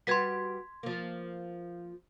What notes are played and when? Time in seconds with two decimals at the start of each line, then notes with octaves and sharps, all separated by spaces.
0.07 G3 F#4 B4 C6 G#6 B6
0.83 F3 A#3